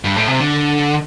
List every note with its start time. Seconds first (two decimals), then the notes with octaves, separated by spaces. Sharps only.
0.05 G2
0.16 A2
0.28 C3
0.40 D3